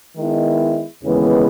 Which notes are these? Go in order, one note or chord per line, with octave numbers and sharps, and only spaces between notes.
D#3 G#3 B3 E4
D#2 C#3 E3 G#3 B3